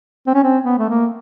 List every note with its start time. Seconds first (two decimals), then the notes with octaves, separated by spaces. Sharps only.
0.27 C4
0.34 C#4
0.43 C4
0.63 B3
0.78 A3
0.89 A#3